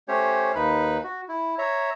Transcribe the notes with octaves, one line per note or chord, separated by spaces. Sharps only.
A3 C#4 G4 C5 C#5
D#2 D#4 B4 B5
F#4
E4
C#5 E5 A#5